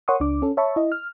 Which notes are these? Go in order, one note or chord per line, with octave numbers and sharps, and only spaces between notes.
A#4 C#5 F#5 C6 C#6 D#6
C#2 D4 D6
C#4 A4
C#5 E5 A5 B5 C#6
E4 D#5
F6